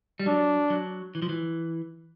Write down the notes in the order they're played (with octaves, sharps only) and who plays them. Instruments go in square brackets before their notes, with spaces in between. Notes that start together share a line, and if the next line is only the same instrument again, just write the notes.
[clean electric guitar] G3
[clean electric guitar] F#3 [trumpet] D4
[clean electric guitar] F#3
E3
F3
E3